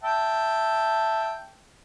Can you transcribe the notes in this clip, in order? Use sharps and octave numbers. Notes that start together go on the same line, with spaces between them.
E5 G5 A5